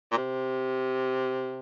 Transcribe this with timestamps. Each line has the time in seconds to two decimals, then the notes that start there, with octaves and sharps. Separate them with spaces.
0.12 A#2
0.17 C3